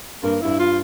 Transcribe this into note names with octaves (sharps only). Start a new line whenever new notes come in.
G2 A#3
G2 E4
F4